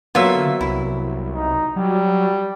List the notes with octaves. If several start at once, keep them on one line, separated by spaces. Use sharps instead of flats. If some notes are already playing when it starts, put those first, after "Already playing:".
D3 F#3 A#3 B3 F4 E5
C2 E4
D#4
F#3 G3